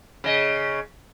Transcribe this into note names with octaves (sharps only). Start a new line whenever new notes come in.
C#3 D#5